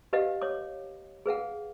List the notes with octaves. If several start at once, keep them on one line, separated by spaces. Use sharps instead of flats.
G4 B4 D#5 F5 F#5
C#5 D6
G#4 B4 F5 F#5